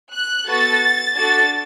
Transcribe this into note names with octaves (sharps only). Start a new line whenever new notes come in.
F#6
B3 F#4 A4 A6
D4 F#4 A4 A6